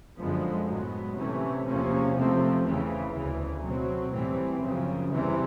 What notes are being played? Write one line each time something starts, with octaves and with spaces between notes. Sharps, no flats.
F#2 D3 F3 G#3 B3
A2 F#3 B3
C3 E3 A3 C#4
E2 C3 F3 A#3 C#4
C3 F3 A3 C4
E2 C#3 E3
D2 C#3 E3
B2 F#3 A3 C4
A2 E3 G3 C4
F#2 C#3 F3
E2 C3 E3 G3 C4